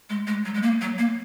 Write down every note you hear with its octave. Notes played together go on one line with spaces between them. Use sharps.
G#3
G#3
F#3
G#3
A#3
F#3
A#3